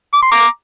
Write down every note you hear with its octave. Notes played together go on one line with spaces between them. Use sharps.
D6
C6
A#5 D6